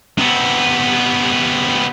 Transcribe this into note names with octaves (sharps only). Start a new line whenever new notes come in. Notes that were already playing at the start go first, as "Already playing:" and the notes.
C3 B3